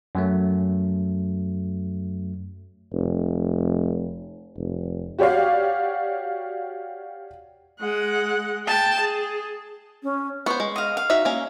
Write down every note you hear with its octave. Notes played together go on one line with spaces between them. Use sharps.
F#2 F#3 A3
F1
F1
F#4 G4 C#5 D5 F5
G#3 F#5
G5 A5
G#4
C#4
B3 C5 C#6
G#3
D#5 F5
F5
D#4 F#4 E5
A#3 C#4